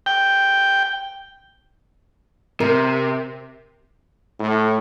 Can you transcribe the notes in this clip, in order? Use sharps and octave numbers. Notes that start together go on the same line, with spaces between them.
G5
C3 A#4
A2